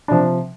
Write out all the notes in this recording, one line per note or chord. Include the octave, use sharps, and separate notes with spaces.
C3 F3 D4